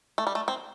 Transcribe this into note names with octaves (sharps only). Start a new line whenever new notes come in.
A3
G3
A3
C4